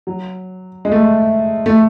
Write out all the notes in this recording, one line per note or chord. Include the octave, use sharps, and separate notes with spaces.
F#3
G#3
A3
A3